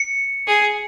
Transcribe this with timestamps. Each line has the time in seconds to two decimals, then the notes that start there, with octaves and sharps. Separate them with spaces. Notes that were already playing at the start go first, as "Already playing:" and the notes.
Already playing: C#7
0.47 G#4